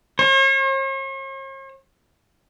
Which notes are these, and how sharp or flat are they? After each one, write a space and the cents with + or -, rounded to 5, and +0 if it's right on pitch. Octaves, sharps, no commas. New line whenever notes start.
C#5 -45